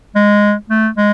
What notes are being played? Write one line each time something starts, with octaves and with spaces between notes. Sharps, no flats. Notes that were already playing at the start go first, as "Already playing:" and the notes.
G#3
A3
G#3